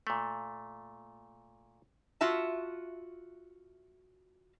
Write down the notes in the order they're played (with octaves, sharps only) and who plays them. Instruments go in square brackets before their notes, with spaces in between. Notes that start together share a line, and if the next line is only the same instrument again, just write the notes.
[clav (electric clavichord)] A#2 A3
[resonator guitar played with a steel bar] F4 F#4 E5 A5